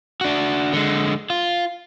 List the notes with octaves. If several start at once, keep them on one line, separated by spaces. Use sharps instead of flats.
D4 F#4
D3 G#3
F4